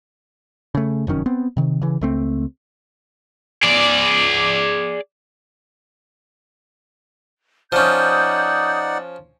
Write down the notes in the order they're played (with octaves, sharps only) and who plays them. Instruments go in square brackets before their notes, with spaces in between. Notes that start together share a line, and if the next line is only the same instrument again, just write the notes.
[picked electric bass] C#3 A3
F1 F#2 D#3 C#4
B3 C4
C3 D#3
C#3 E3
C#2 A3 C4
[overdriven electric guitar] G#4 D5
[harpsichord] F3 C#4 [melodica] D#4 D5 F#5 [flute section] D#6 G6